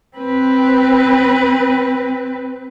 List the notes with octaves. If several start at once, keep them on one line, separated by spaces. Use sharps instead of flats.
C4 B4